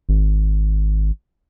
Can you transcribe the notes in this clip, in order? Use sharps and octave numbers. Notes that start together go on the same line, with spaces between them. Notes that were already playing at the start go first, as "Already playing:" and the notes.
G#1